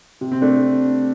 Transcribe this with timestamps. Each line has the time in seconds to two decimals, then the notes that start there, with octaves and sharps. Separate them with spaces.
0.21 C3
0.31 C4
0.41 A3 D4